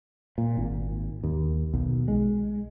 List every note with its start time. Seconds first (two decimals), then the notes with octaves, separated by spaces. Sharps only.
0.38 A#2
0.57 G#1
1.24 D#2
1.73 B1
2.08 G#3